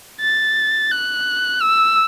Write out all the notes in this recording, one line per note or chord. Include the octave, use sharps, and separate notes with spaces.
A6
F#6
E6